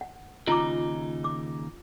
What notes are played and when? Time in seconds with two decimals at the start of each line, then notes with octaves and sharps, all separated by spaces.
0.01 F#5
0.47 D#2 C#3 D#4 F4 A#5 D6
1.24 D6